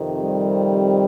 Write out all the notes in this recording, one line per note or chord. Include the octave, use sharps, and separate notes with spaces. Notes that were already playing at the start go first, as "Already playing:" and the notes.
Already playing: F2 C3 D#3
G3